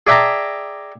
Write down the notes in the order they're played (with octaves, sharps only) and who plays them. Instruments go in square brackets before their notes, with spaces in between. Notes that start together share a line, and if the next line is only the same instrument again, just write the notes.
[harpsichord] G#4 D5 E5 G5 A5 A#5